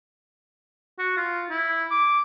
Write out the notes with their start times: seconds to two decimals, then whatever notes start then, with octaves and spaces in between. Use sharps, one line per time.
0.99 F#4
1.17 F4
1.50 E4
1.91 D6